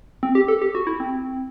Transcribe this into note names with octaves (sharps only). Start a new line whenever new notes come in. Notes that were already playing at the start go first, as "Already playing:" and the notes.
C4
G4
A4
G4
F#4
E4
C4